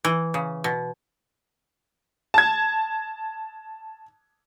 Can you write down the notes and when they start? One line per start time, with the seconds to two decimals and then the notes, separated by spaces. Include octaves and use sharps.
0.05 E3
0.34 C#3
0.64 B2
2.34 A5 G#6